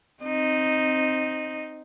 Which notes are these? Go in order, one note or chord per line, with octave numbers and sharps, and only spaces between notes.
C4 D#4